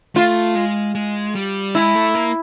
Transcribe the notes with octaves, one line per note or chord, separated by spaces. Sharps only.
A3 F4
G#3
G#3
G3
G#3 E4
A3
A#3